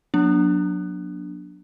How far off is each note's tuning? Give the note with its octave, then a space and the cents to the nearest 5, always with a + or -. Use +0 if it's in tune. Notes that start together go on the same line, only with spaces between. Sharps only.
F#3 -30 B3 -45 D4 -5